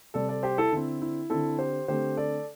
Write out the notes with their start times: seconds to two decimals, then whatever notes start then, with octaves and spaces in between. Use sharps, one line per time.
0.14 C3 G3 C4 A4 D5
0.29 A4 D5
0.43 G4 C5
0.58 E4 A4
0.72 D3 C4 E4
1.02 E4
1.30 D3 C4 E4 A4
1.59 G4 C5
1.88 D3 A3 C4 G4 C5
2.17 A4 D5